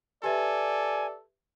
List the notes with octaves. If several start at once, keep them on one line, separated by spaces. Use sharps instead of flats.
G4 A4 B4 D5 E5 G#5